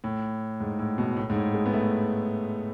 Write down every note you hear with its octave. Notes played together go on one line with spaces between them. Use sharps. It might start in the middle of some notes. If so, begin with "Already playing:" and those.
A2
G#2
A2
B2
A2
G#2
A2
G#3
B3
A3